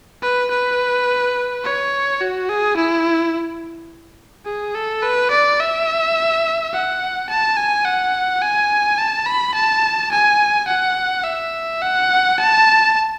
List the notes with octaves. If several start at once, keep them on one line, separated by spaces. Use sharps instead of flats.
B4
B4
C#5
F#4
G#4
E4
G#4
A4
B4
D5
E5
F#5
A5
G#5
F#5
G#5
A5
B5
A5
G#5
F#5
E5
F#5
A5